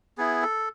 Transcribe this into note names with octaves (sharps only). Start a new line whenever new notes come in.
B3 E4 G#4
A4